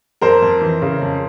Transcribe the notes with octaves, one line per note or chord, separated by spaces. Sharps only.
F2 A#4 C5
F2
E3
C#3
F2